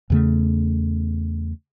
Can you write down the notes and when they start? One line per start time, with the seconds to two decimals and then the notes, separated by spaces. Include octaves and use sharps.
0.10 E2 C#3 A3